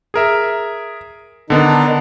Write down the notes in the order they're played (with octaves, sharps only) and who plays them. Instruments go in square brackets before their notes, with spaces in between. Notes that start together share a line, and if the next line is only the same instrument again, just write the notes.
[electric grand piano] G#4 A#4 E5
[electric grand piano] D3 B3 D4 [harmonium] D#3 D#4